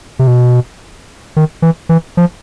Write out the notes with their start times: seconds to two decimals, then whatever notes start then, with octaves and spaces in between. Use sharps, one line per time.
0.19 C3
0.27 B2
1.36 D#3
1.62 E3
1.89 E3
2.17 F3